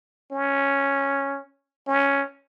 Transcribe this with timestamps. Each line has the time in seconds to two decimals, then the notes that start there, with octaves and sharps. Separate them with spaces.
0.32 C#4
1.87 C#4